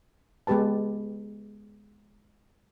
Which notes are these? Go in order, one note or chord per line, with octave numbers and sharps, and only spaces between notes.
G#3 B3 G4 B4 A5